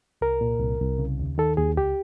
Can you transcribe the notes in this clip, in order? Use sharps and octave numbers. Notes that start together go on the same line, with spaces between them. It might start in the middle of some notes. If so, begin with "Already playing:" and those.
C2 A#4
A#2
C2
C2
C#3
D#2
D#3 A4
D#2 G#4
C#2 G4